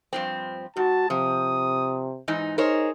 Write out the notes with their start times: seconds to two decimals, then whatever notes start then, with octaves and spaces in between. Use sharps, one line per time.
0.13 G2 F3 C4
0.77 G#2 F#4 A5
1.10 C3 F3 D#6
2.28 G#2 E3 D#4
2.58 D#4 G#4 A#4 C5 C#5